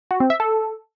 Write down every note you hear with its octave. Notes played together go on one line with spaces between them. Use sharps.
F#4
C4
E5
A4